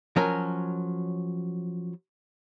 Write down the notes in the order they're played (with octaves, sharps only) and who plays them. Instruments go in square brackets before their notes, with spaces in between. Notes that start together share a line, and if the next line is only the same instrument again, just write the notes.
[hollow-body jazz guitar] F3 F#3 C#4 A#4